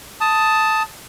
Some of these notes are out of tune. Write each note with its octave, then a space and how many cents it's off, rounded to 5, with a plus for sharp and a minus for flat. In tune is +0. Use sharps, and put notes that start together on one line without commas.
A5 +0 D#6 +10